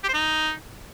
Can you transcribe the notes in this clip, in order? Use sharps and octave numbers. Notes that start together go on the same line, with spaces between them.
G4
C5
D#4